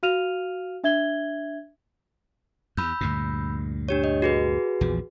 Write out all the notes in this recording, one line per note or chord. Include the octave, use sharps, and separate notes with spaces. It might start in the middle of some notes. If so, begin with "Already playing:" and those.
F#4 F5 F6 D#7 F7
D4 E5 G#6 G7
E2 B5 E6 G6
D2 G2 A#2
D4 G4 C#5
D#5
F#4 G#4 B4
A#1 E2 F3